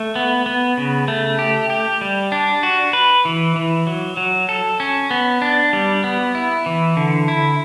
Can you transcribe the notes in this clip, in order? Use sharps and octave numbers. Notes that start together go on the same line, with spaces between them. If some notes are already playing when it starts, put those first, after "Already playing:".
Already playing: A3
B3
B3
C#3
A3
G4
G4
G3
D4
F#4
B4
E3
E3
F#3
F#3
A4
C#4
B3
D4
G3
B3
E4
E3
D3
E4